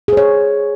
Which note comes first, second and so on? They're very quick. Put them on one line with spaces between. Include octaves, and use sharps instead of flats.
G#4 C5 C#5